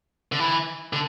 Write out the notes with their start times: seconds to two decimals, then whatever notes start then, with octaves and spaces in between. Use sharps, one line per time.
0.32 D3
0.40 E3
0.93 D3